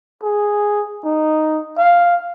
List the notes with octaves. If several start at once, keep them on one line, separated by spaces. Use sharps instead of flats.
G#4
D#4
F5